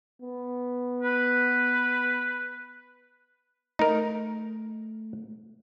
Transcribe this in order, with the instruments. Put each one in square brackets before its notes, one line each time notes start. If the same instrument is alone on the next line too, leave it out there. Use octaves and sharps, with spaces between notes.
[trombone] B3
[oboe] B4
[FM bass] A3 [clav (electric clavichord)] D#4 A#4